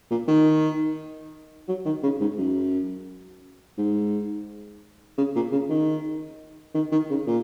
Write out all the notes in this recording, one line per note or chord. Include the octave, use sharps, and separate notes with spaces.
A#2
D#3
F#3
D#3
C#3
G#2
F#2
G#2
C#3
A#2
C#3
D#3
D#3
D#3
C#3
A#2